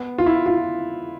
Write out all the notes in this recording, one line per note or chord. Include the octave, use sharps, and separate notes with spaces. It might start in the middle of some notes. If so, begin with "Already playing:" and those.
Already playing: B3
F4
E4
F4